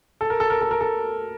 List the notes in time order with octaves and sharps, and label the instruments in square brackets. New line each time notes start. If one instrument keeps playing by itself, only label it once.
[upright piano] A4
A#4
A4
A#4
A4
A#4
A4